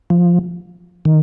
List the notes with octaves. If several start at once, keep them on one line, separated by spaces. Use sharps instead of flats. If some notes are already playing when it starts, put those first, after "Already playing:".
F3
D#3